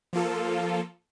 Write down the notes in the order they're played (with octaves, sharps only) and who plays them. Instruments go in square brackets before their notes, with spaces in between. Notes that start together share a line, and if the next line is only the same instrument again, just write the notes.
[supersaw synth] F3 A#3 F4 A4